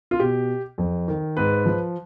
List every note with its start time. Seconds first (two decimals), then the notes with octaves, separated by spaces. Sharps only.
0.11 F4
0.20 B2 G4
0.78 F2
1.08 D#3
1.37 G#2 B4
1.66 F3